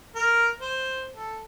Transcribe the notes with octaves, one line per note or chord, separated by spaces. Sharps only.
A#4
C5
A4